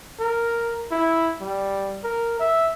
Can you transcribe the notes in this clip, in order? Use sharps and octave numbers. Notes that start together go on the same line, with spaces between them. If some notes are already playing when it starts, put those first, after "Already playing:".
A#4
E4
G3
A#4
E5